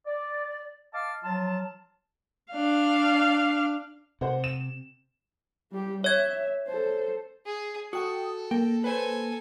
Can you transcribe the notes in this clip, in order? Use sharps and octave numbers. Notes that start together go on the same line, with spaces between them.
D5
D#5 F5 A5 D6 F6
F3 F#3 F4 A5
D4 F5
C3 C5 F#5
E7
G3 G4
C#5 E5 G#6
A4 C5
G#4
F#4 A4 G5 D#6
A#3 G5
A4 B4 C5 G#5